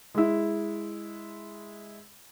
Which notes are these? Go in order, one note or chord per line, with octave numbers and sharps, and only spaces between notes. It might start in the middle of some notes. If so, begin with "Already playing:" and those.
G#3 E4